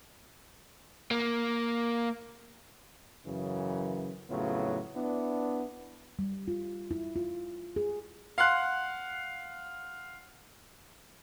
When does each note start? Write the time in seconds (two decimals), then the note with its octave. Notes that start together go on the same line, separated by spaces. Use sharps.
1.11 A#3
3.26 F#2 C#3 E3
4.30 F2 A2 C#3 F#3 B3 F4
4.96 B3 D4 E4
6.19 G3
6.48 F4
6.91 E4
7.16 F4
7.76 G#4
8.38 F5 F#5 C6 F#6